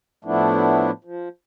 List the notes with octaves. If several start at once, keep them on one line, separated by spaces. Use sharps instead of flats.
A2 F3 A3 B3 D4 E4
F3